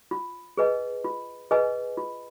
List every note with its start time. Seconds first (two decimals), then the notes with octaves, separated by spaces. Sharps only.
0.11 F4
0.57 G#4 B4 D#5 G#5
1.04 F4
1.51 G#4 B4 D#5 G#5
1.97 F4